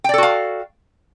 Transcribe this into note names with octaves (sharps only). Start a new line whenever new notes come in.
F#4 A4 D5 F5 G5